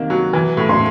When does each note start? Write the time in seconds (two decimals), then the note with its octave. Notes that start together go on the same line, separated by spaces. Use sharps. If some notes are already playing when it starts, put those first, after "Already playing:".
Already playing: C3 D#3 A#3
0.10 F#3
0.33 E3
0.57 A2
0.69 C6